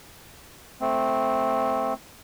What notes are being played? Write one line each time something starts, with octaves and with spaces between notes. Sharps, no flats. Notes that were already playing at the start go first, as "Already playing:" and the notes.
A3 C4